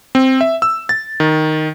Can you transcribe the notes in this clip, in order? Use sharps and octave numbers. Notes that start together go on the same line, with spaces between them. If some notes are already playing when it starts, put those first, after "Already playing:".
C4
E5
E6
A6
D#3